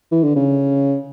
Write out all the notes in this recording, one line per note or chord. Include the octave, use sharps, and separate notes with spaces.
E3
D3
C#3